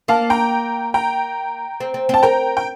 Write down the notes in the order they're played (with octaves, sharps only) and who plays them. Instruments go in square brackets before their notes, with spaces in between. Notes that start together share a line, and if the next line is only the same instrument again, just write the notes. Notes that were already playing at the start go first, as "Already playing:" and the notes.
[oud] A#3 [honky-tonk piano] F5 A5
[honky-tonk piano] G5 A#5
G5 A#5
[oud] C4
C4
[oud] C4 [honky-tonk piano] A5
[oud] A#4 [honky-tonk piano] G5 A#5
[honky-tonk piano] G5